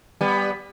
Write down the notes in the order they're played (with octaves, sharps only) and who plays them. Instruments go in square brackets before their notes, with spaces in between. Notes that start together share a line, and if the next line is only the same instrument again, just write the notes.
[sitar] G3 B3